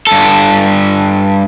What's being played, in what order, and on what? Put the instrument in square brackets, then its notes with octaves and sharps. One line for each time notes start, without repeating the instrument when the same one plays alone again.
[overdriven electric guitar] G2 A4